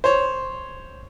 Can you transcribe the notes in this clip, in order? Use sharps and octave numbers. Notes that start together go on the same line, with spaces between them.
C5 C#5